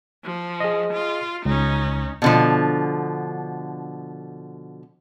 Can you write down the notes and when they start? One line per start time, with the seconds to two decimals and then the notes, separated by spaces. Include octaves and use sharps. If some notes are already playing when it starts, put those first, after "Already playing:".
0.24 F3
0.60 G#4 D#5
0.93 F4
1.45 C#2 C#4 D#4
2.22 B2 D3 F3